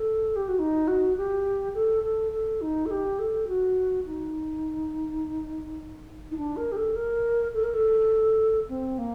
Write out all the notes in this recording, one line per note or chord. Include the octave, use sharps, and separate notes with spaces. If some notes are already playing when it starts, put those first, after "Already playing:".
Already playing: A4
G4
F#4
D#4
F#4
G4
A4
A4
A4
D#4
A4
G4
A4
F#4
D#4
D#4
D4
A#4
G4
A4
A#4
A4
A#4
A4
C4
A#3